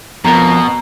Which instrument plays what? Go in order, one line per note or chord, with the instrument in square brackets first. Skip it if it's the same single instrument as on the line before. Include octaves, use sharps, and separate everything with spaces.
[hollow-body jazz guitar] F2 A#4 [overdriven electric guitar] B2 [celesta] A#5